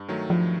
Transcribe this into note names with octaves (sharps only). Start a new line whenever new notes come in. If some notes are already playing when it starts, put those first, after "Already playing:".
Already playing: G2
D#3 F#3 A3
G2 F3